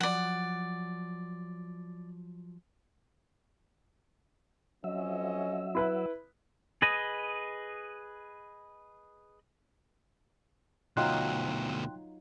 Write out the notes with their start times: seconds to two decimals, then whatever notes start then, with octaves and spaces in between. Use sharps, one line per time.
0.01 F3 F#3 D5 F#5
4.84 F2 F#3 C#4 D#5 E5
5.75 E4 B4 B5
6.82 G#4 B4 D#5
10.97 D2 B2 F#3 D#4 F4 G5 C6 F#6